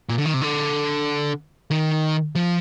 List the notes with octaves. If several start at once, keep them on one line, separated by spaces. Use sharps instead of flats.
A#2
D3
D#3
C3
D3
D#3
F3